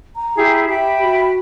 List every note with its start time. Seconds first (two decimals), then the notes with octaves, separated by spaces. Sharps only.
0.16 A#5
0.37 E4 G4 G#4
0.69 G4 E5 G5 B5
1.03 F#4